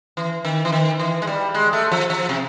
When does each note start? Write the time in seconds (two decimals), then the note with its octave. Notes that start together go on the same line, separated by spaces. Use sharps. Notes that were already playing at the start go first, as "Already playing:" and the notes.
0.17 E3
0.45 D#3
0.65 E3
0.72 D#3
0.99 E3
1.22 G#3
1.27 G3
1.54 G#3
1.73 A3
1.92 F3
2.10 F3
2.29 C3